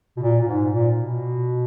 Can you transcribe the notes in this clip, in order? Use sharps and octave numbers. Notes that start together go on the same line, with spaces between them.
B2
A#2
A#2
G#2
A#2
B2